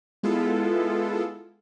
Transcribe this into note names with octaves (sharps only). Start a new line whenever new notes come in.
G#3 B3 E4 F4 A4